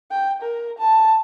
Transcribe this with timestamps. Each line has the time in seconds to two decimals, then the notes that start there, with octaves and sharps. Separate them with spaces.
0.11 G5
0.42 A#4
0.79 A5